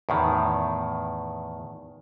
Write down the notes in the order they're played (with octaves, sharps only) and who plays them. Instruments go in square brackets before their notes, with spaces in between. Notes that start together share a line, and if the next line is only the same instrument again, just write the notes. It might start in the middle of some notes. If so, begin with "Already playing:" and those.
[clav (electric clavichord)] E2 A2 D#3